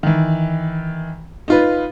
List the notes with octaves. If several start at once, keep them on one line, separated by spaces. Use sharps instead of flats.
D#3 E3
D#4 F4 B4